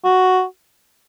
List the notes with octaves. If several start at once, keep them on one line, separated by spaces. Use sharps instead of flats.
F#4